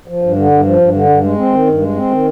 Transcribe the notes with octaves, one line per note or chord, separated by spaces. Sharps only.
F3
G2
D3
G2
F3
G2
D3
G2
G#3
C4
D#3
G2
G#3
C4
D#3